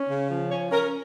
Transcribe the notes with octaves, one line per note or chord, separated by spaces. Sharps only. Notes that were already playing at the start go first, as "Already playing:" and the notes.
Already playing: C#4
C#3
F3
C#4 C#5
C#4 A#4